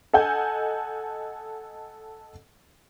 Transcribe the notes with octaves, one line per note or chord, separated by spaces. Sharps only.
A4 D#5 F#5 G#5 G6